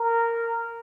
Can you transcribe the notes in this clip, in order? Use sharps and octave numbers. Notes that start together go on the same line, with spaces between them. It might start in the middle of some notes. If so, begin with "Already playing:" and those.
Already playing: A#4